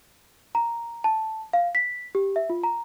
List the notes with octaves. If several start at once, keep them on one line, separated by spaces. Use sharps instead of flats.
A#5
A5
F5
B6
G4
E5
F4
A#5